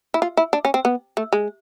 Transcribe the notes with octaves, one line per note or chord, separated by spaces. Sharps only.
E4
F4
E4
D4
C#4
C4
B3
A3
G#3